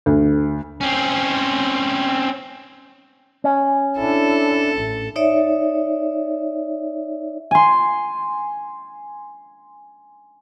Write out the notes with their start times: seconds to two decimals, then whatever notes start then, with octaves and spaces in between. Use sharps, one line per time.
0.06 D2
0.81 C4 C#4
3.44 C#4
3.98 D4 E4 A4
4.76 A1
5.16 D#4 C#5 D5 E5
7.51 G#5 C6